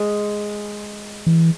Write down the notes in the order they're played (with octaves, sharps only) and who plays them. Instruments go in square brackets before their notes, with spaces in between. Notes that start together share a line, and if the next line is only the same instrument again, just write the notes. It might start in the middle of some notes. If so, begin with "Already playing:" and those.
Already playing: [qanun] G#3
[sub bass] E3